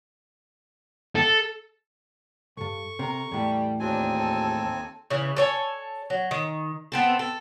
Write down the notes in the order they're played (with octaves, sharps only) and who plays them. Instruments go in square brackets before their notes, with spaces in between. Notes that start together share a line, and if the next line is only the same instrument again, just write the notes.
[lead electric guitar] A4
[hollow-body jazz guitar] B1 G2 [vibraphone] A4 [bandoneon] C#6
[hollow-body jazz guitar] C3 [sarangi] A#4
[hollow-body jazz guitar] E2 A2 [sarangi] G3
[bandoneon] D#2 C4 G#5 [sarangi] D4 [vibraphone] F#4 G#4 C#5
[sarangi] A4
[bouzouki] C#3 E3
A4 C#5 G#5
F#3
D#3
B3 C4 A4
A4